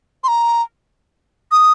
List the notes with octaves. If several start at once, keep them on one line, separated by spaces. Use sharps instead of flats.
C6
A#5
D#6